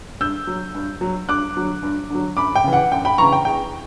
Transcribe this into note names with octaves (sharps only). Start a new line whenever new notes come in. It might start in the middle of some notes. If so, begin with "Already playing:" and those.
G2 E6 G6
F#3
G2
F#3
G2 D6 F#6
D3 F#3
G2
D3 F#3
F#2 B5 D6
G5
C#3 E3
F#5
F#2 G5
G5 B5
C#3 E3 A#5 C#6
G5
E2 G5